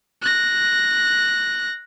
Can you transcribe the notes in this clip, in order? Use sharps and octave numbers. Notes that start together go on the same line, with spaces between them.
F#6 A#6